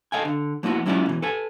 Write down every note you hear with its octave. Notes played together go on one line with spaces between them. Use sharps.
A4 D#5 F5 G5 G#5
D3
F3 A#3 B3 E4 F#4
F#3 G#3 C#4 E4 F4 D5
B2 E3
A4 B4 G#5